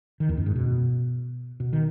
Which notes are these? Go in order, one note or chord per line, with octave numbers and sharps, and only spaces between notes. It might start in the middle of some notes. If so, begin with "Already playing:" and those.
D#3
E2
F#2
G#2
B2
B2
D#3